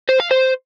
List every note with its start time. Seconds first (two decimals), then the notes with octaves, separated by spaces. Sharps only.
0.09 C5
0.20 F5
0.31 C5